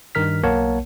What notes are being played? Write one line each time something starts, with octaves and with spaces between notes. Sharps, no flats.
G2 D#3 A#4 F6 B6
B1 A#3 A#4 C#5 F#5 A5